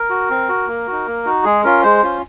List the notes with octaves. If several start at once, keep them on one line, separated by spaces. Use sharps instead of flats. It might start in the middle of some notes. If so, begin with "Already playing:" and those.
Already playing: A#4
F#4
C4
F#4
A#3
D#4 F#4
A#3
D#4 F#4
G#3 G#4
C#4 F4 A#4
G#3 C5
C#4 F4